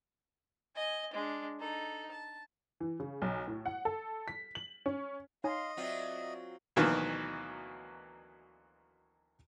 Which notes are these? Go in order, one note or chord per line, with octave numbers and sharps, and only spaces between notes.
D#5 G#5
G#3 D4
D#4 A4
A5
E3
C#3
B1
A2
F#5
A4
B6
F#7
C#4
D#4 C#5 D#5 F5 G#5 C6
F#3 C4 F4 D5 E5
D2 B2 D#3 E3 F#3 A#3